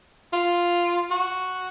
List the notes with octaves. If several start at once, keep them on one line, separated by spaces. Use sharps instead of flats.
F4
F#4